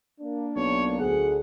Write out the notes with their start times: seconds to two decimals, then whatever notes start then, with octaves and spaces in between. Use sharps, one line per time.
0.21 A#3 D4
0.56 B1 C#5
1.00 D2 G#4 F#5